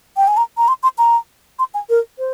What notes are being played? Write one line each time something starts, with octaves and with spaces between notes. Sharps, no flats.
G5
G#5
A#5
A#5
C6
C6
A#5
C6
G#5
A#4
C5